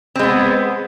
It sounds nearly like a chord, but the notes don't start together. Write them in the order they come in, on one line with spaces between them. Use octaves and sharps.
C4 G#3 B3